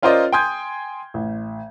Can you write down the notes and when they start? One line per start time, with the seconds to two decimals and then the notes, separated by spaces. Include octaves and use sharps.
0.03 C#4 F4 A#4 C5 D5 D#5
0.32 G5 G#5 C6 D#6 G6 G#6
1.14 A1